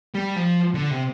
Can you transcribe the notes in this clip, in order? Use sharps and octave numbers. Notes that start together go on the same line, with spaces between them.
G3
F3
D3
C3